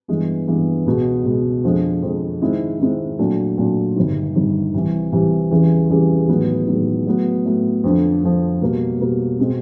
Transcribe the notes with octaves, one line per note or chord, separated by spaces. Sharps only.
G2 E3 G#3 B3
G2 E3 G#3 B3
C#2 B2 G#3
C#2 B2 G#3
F2 D3 F3 G#3
F2 D3 F3 G#3
G#2 D#3 G#3 C4 E4
G#2 D#3 G#3 C4 E4
A#2 F#3 A3 D4
A#2 F#3 A3 D4
G1 G2 D#3
G1 G2 D#3
C2 C3 E3
C2 C3 E3
E2 C#3 E3 G3
E2 C#3 E3 G3
A1 G#2 D#3 F#3 B3
A1 G#2 D#3 F#3 B3
A2 F#3 B3
A2 F#3 B3
F2 D3 F3
F2 D3 F3
B2 G3 A#3
B2 G3 A#3
B2 G#3 C4